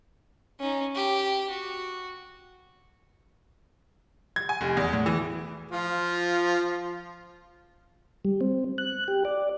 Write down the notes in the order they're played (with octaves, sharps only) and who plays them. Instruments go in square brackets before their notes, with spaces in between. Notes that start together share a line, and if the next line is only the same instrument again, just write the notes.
[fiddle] C#4 D#4
G4
F#4
[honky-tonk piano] G#6
G#5
F1
E2
A2
E3
[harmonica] F3 F4
[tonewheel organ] G3
C4
F#6
G4
D5